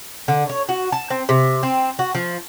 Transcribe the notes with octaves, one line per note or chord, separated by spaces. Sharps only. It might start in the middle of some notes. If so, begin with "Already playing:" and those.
D3
C#5
F#4
A5
C4
C3
C4
F#4
F3